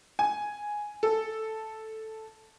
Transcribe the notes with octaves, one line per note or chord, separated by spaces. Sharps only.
G#5
A4